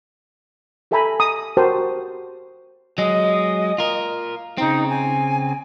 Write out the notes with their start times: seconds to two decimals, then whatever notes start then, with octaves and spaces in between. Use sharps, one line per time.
0.91 G4 A4 E5 G#5 A#5 B5
1.20 A#5 D#6
1.57 F#4 G4 A#4 C5 G5 A5
2.98 F#3 G#3 D#5
3.78 F4 A#4
4.58 C#3 C4 D#4
4.89 G#5